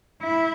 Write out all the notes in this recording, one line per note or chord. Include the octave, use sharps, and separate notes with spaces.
E4